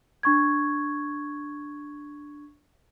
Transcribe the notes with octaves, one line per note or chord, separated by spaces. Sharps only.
D4 C#6 G#6